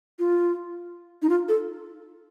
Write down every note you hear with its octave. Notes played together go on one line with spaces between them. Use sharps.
F4
D#4
F4
A4